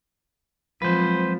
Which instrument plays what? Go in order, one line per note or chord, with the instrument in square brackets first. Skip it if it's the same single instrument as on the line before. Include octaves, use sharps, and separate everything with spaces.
[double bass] F3 [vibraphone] F#3 G#3 C4 [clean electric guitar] B4 C5